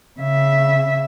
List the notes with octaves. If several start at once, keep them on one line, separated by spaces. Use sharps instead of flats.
C#3 E5